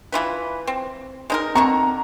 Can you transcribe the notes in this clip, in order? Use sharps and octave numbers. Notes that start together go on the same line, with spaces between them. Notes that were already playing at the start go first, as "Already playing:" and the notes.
E3 F4 B4
C4
G#3 D#4 A#4 A#5
D3 D#3 C4 A#5 C#6